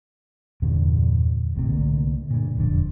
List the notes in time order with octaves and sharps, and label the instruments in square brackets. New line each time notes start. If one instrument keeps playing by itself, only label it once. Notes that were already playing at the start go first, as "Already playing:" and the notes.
[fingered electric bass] E2 G2 A#2 D3
G#1 A2 C3
C2 D3 A3 A#3
G2 A#2
E1 F2 D3